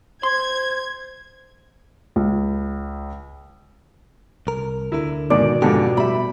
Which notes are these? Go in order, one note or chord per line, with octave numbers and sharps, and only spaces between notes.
C5 C6 G#6
C#2
C2 A#4
D2 D3 E4 A#4
G#2 B2 D#3 D5
F2 G#2 D3 G4
A2 G3 E5 B5